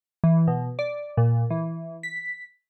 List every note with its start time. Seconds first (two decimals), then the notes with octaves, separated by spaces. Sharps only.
0.24 E3
0.48 B2
0.79 D5
1.17 A#2
1.50 E3
2.03 B6